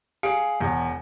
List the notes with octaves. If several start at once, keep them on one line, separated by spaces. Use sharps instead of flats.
G#4 F5 C#7 D7
E1 E2